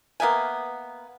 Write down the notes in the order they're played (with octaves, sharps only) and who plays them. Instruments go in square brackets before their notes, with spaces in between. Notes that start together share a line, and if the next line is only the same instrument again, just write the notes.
[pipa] A#3 B3 E5 G#5